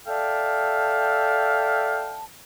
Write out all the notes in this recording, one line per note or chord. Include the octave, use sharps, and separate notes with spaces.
A4 D5 E5 F5 G5 A5